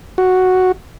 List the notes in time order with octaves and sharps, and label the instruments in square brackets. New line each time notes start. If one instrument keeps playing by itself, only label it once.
[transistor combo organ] F#4